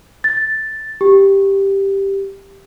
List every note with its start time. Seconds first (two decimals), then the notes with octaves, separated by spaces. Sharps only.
0.24 A6
1.01 G4